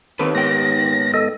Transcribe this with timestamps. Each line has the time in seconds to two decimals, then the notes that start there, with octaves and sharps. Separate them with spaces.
0.19 D#2 C4 A4 B4
0.35 G#2 B3 G5 A#6
1.14 A4 D#5